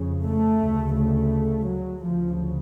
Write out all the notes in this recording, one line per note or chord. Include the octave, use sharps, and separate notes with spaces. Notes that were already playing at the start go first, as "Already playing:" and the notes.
Already playing: F2 C#3
A3
D2 C#3
A3
F#3
D2 C#3 F3